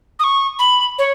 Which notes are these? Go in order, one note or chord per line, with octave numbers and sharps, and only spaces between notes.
D#6
C#6
B5
C#5